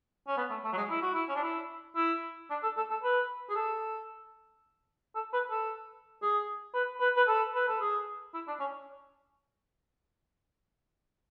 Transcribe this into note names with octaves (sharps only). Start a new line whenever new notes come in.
C#4
B3
A3
A3
F#3
G#3
E4
F#4
E4
C#4
D4
E4
E4
D4
A4
A4
A4
B4
G#4
A4
A4
B4
A4
G#4
B4
B4
B4
A4
B4
A4
G#4
E4
D4
C#4